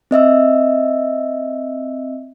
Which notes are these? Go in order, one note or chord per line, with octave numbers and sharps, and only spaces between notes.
C4 D#5 E5 E6